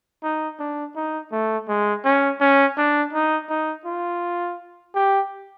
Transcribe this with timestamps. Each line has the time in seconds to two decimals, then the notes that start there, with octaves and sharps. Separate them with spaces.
0.23 D#4
0.59 D4
0.96 D#4
1.32 A3
1.68 G#3
2.04 C#4
2.41 C#4
2.78 D4
3.13 D#4
3.49 D#4
3.85 F4
4.95 G4